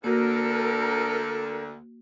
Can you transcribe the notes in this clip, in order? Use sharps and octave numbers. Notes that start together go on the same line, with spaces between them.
D2 D3 A#3 F#4 A4 A#4